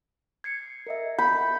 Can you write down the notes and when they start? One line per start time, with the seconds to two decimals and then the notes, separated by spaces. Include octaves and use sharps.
0.44 G#6 C7 C#7
0.87 A#4 D#5 E5
1.18 B5 G6